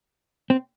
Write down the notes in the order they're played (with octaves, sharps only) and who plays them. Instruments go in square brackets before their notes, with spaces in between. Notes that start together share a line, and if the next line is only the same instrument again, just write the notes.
[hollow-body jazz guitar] C4